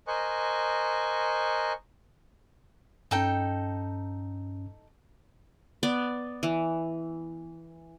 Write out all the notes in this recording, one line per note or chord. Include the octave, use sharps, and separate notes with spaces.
A#4 C5 D#5 G#5 C#6 F#6
G2 C#4 D#4 A4 G5
B3 D5
E3